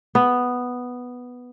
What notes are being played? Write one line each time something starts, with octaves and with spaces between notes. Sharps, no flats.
B3